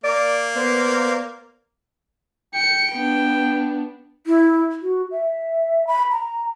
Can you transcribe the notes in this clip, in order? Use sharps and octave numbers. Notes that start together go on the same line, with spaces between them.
A#3 D5
B3 C5 D5 F5
G5 C#7
B3 D4
E4
F#4
E5
B5
A#5